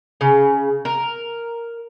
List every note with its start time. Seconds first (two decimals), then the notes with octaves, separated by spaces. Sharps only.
0.21 C#3
0.85 A#4